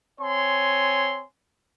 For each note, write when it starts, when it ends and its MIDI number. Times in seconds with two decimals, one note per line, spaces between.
0.20 1.24 60
0.20 1.24 73
0.20 1.24 80
0.20 1.24 84